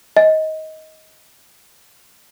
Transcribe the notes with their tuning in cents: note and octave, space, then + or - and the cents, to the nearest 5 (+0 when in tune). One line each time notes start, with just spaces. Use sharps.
D#5 +20